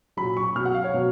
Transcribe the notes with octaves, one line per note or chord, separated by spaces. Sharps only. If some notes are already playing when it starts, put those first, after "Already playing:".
F#3 B5
A#2
C#6
B2 F#3 F6
F#5
F5
C#5
B2 F#3